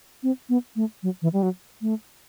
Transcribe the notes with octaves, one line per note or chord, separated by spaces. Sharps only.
C4
B3
A3
F#3
E3
G3
F#3
A3